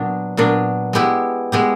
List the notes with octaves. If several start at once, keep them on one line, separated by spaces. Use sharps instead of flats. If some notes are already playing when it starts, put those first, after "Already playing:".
Already playing: A#2 F#3 B3 D4
A#2 F#3 B3 D4
G#3 B3 E4 G4
G#3 B3 E4 G4